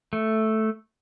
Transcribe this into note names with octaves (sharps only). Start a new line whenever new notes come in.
A3